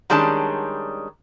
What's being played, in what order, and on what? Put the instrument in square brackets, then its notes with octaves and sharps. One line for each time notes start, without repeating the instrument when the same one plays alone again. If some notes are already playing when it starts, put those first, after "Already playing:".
[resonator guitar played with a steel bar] D#3 G3 G#3 C#4 D4 A5